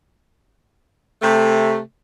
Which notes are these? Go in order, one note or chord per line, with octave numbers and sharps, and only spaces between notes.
C3 A3